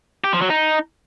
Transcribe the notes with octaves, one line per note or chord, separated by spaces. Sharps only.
G4
F3
F#3
D#4